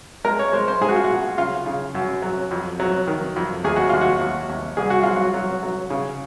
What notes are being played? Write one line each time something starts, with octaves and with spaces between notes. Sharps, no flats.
G#3 A#4
C#5
G#3 C5
C5
G#2 G#4
F#4
F4
F#4
A#1
C#3 F4
C#3
F#2
F#3
F2
F#3
D#3
F2
D#2 G#4
F#4
D#2 F4
F#4
D#2
D#2
C2 G#4
F#4
F#3 F4
F#4
F#3
F#3
C#3